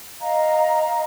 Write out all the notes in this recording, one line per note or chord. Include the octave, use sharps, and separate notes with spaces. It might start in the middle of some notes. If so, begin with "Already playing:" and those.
D#5 F5 A#5